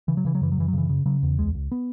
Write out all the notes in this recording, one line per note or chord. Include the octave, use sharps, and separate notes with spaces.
C#3 E3
F#3
C#3 E3
F#3
F#2 E3
F#3
F#2 E3
F#3
C#3 E3
C#3
C#3 F#3
E2
C#2 G#3
C#2
B3